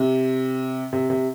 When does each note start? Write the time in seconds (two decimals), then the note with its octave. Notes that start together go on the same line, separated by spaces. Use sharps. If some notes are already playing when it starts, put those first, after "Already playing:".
Already playing: C3
0.93 C3
1.10 C3